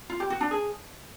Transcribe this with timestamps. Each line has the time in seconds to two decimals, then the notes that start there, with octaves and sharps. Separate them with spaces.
0.10 F4
0.20 G4
0.30 F#4
0.41 D4
0.51 G#4